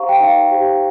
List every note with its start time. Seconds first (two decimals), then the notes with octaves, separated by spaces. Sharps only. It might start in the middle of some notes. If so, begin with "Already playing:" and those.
Already playing: D#4 G4 C5 F5 A#5 C#6
0.09 G5
0.20 D#4 F5
0.51 G4 C5